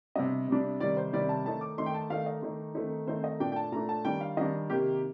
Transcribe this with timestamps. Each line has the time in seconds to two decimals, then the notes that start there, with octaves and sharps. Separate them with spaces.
0.16 C3 G3 D4 D#5
0.48 C3 G3 D4
0.80 C3 D#3 G3 D5
0.97 C5
1.13 C3 D#3 G3 D5
1.29 A5
1.45 D#3 A3 D#4 A5
1.61 D6
1.78 D#3 A3 D#4 C6
1.86 G5
1.94 A5
2.10 D#3 A3 D#4 F5
2.26 D#5
2.43 D#3 A3 D#4
2.75 D#3 A3 C4 D#4
3.07 D#3 A3 C4 D#4 C5
3.24 D#5
3.40 A#2 A3 D4 G5
3.52 G5
3.56 A5
3.72 A#2 A3 D4 A#5
3.89 A5
4.05 D#3 G3 D4 G5
4.21 F5
4.37 D#3 G3 D4 D#5
4.69 C3 D#3 A#3 G4